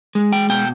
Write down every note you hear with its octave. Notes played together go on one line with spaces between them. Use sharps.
G#3
G5
B2 G5